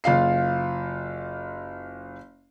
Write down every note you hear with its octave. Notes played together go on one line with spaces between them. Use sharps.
F#1 F4 F5 C7